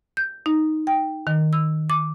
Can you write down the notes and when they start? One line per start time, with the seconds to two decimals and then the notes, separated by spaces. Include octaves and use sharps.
0.17 G6
0.46 D#4
0.87 G5
1.27 D#3
1.53 E6
1.90 D6